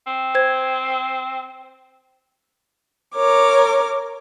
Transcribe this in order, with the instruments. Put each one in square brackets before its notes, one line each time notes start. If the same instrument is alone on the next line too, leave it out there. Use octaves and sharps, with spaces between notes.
[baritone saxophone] C4
[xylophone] C5 G#6
[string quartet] A#4 C#5 D6